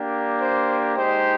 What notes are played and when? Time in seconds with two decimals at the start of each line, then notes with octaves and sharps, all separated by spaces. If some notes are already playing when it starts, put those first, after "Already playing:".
Already playing: A#3 D4 G4
0.39 C5
0.96 G#3 D#4 G4 C5